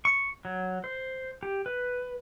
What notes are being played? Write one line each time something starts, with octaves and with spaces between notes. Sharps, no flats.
C#6
F#3
C5
G4
B4